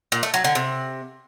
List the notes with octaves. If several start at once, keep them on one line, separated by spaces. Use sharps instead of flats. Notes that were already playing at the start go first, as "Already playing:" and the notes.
A#2
A3
F#3
D3
C3